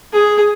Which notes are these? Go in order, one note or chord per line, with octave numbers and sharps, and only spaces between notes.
G#4